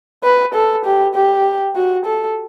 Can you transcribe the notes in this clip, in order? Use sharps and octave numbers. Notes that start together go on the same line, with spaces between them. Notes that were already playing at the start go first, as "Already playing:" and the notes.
B4
A4
G4
G4
F#4
A4